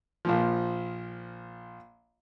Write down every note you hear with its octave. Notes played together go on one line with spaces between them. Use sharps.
A#1 A#2 F3